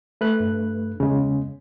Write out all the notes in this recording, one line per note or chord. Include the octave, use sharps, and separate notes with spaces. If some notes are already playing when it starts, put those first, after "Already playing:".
A3 B4 F#6
G2
E2 C#3 G#3